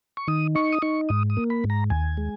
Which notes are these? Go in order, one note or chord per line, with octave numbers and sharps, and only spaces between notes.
C#6
D#3 D#6
D#4 C#6
D#6
D#4 C#6
G#2 D#6
D#6
A#3
B5
G#2
A#5
D#2 G#5
G#3